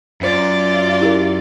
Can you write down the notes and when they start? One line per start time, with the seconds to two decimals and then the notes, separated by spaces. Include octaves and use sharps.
0.21 F#2 F4 D5
1.01 E4 G4 A#4